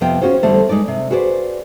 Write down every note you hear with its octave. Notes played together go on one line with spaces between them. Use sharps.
F2 C3 F3 B3 F4 G5
C#4 D#4 F4 F#4 G#4 C5
E2 D3 G3 A3 A4 C5
G#3 D#4 B4 D5
C3
F#4 G#4 B4 C5 D5